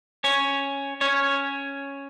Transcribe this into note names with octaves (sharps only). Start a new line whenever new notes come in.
C#4 C#5
C#4 C#5